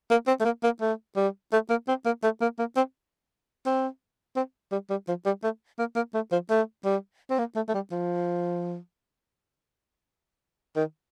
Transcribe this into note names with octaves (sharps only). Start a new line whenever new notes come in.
A#3
C4
A3
A#3
A#3
A3
G3
A3
A#3
C4
A#3
A3
A#3
A#3
C4
C4
C4
G3
G3
F3
G3
A3
A#3
A#3
A3
F3
A3
G3
C4
A#3
A3
A3
G3
F3
D#3